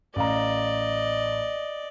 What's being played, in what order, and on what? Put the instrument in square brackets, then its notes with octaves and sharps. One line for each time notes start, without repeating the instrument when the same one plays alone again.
[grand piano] A1 F5 A#5 [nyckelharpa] D5 D#5